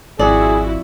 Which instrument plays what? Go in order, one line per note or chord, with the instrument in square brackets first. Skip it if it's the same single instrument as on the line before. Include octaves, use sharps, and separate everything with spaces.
[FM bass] G#1 [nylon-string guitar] F2 D5 [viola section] E4 F#4 [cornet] G#4